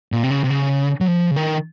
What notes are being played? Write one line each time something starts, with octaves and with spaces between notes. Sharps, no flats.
A#2
C3
C#3
C3
C#3
F#3
F3
C#3
D#3